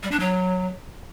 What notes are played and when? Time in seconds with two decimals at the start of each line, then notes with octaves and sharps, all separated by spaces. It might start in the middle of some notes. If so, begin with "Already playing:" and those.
0.03 G3
0.11 D4
0.20 F#3